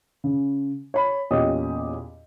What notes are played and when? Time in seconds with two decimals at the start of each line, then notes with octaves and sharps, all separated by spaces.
0.24 C#3
0.94 C#5 B5
1.31 E2 A#2 C#4 G4 D#5 D#6